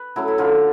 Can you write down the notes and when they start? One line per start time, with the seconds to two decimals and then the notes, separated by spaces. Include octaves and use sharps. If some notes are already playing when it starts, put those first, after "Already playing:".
Already playing: B4
0.16 F#3 A3 C#4 E4
0.28 E4
0.38 D3 F4